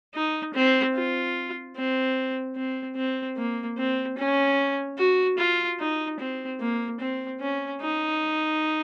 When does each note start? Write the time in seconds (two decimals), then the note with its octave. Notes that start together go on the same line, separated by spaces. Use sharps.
0.15 D#4
0.54 C4
0.95 F4
1.76 C4
2.56 C4
2.96 C4
3.37 A#3
3.78 C4
4.18 C#4
4.98 F#4
5.39 F4
5.80 D#4
6.20 C4
6.61 A#3
7.00 C4
7.41 C#4
7.81 D#4